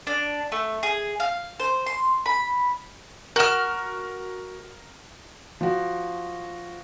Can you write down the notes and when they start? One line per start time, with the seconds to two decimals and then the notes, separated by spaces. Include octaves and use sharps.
0.07 D4
0.52 A3
0.83 G#4
1.20 F5
1.60 C5
1.86 C6
2.26 B5
3.36 F#4 A#4 F6 E7
5.61 F3 F#4